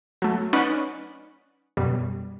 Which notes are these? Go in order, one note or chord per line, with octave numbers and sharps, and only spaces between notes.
F#3 A3
C#4 D#4 B4 D5 F#5
F#2 B2 G3